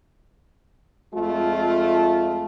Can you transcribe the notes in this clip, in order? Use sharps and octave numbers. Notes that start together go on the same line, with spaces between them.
F2 G#3 A3 F4